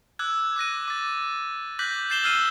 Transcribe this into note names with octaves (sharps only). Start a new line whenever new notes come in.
D6 E6 F#6 G#6
D6 F#6 A#6 D#7
D6 A6
D6 F#6 G6 A#6 B6 F#7
G6 A6 C7 E7 F#7 G7
E6 F6 G#6 C7 D#7